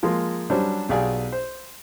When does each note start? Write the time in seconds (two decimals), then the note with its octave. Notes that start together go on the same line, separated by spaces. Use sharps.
0.03 F3 G#3 A#3 F4
0.50 F#3 G3 C#4 D4 C5
0.89 B1 G4 G#4 D5 F5 G#5
1.33 C5